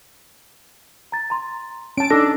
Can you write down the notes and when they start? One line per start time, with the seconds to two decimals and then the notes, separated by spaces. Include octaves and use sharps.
1.12 A#5 A6
1.30 A#5 C6
1.97 C#4 A5 D7
2.10 D4 D#4 A4 D6 E6 A#6